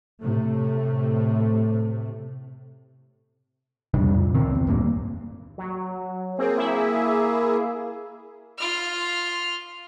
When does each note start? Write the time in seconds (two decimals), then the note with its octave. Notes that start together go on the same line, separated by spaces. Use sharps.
0.21 A2 C3 A3
3.94 F2 C3 G3 D4
4.14 A#2
4.35 C#2 D#3 C4
4.55 E2
4.67 D1 G2 A#3
5.58 F#3
6.39 A#3 C4 G#4
6.58 E4 E5
8.58 F4 F6